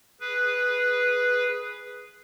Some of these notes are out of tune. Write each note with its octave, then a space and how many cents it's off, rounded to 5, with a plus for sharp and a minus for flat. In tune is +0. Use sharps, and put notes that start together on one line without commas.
G#4 +0 B4 +0